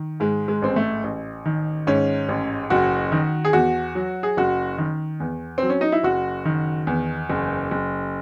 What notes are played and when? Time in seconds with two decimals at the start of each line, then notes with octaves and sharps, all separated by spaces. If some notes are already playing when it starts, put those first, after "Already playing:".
Already playing: D#3
0.20 G#2 G#3
0.48 G#3
0.62 A1 C4
0.76 A3
1.04 A1
1.46 D#3
1.87 G#2 C#4
2.29 A1
2.70 F#1 F#4
3.12 D#3
3.45 G#4
3.53 E2 F#4
3.95 F#3
4.23 G#4
4.37 F#1 F#4
4.78 D#3
5.20 E2
5.58 F#3 C4
5.70 C#4
5.81 D#4
5.92 E4
6.03 F#1 F#4
6.45 D#3
6.87 E2
7.30 F#1
7.71 F#1